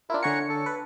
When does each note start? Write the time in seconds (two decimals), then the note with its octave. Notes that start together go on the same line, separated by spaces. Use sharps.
0.10 D4 E4 F4 A#4
0.23 D3 C#5 F#5 G#5 A#5 C#7
0.49 A4
0.66 B4